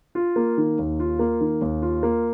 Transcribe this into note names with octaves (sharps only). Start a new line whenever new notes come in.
F4
A#3
D#3
D#2
F4
A#3
D#3
D#2
F4
A#3